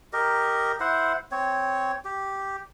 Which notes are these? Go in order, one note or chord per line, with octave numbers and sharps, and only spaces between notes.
G4 A#4 D#5
E4 C5 F#5
C4 C#5
G4